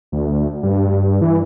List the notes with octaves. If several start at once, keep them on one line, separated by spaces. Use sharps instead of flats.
D2
G2
E3